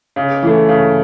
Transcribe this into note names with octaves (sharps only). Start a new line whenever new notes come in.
C#3
E3 A3
C#3